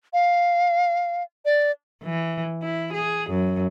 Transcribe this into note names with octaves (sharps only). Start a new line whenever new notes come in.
F5
D5
E3
E4
G#4
F#2